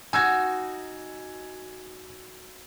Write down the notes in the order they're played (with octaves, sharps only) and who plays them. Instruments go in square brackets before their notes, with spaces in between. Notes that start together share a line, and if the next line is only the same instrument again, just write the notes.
[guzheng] D#4 F#4 [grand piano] G#5 E6 G#6